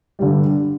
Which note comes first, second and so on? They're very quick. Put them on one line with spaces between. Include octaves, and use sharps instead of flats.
G3 D3 G2